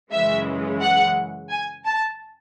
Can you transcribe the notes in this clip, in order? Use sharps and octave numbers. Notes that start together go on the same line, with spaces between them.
F#2 C#3 E3 G#3 E5
F#5
G#5
A5